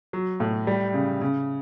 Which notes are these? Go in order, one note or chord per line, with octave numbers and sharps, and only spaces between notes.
F#3
A2
G3
C#3
C#3